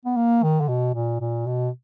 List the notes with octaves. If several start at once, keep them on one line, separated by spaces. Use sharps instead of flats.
B3
A#3
D#3
D3
B2
A#2
A#2
B2